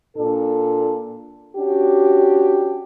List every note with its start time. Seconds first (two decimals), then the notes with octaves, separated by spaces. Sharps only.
0.17 A#2 D4 A4
1.56 C#4 D4 F#4 G4